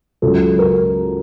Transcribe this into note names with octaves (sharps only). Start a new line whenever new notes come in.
C#2 C#3 F#3 A4
A#4